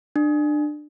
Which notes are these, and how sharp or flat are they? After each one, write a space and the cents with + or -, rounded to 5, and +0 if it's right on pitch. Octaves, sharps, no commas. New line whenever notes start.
D4 +25